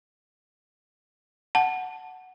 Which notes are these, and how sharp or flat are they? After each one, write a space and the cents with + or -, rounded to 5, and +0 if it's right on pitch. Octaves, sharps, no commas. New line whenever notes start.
F#5 +0 A5 +0